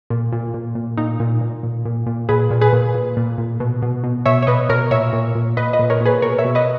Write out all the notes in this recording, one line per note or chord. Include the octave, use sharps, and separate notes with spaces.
A#2
A#2
A#2
A#2
A#2 D#4
A#2
A#2
A#2
A#2
A#2
A#2 G#4 B4
A#2
G#4 B4
A#2
A#2
A#2
A#2
B2
B2
B2
B2 C#5 E5
C#5
B2 B4 D#5
B2 A#4 C#5
A#2 C#5 E5
A#2
A#2
A#2 B4 D#5
B4 D#5
A#2
A#4 C#5
A#2
G#4 B4
B2 A#4 C#5
C#5 E5
B2
B4 D#5